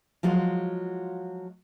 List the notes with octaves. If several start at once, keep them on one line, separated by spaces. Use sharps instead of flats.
F3 F#3 G#3 F4